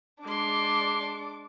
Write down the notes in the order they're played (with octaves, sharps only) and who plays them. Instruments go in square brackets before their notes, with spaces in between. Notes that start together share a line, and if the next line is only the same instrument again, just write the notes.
[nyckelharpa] G#3 C6 [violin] D4 D6